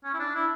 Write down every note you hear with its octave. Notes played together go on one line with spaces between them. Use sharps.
C#4
E4
D4
E4